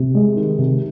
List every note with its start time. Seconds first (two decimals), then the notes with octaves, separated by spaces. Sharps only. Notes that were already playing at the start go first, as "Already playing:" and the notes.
Already playing: C3
0.15 G#3
0.36 D#3
0.59 C3